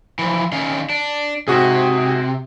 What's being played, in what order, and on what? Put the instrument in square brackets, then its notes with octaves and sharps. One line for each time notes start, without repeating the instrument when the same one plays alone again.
[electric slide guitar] E3 F3
D#3 C#4 F5
D4
[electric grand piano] G#2 F#4 G#4 [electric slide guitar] C3